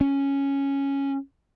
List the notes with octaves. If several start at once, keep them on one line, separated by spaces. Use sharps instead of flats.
C#4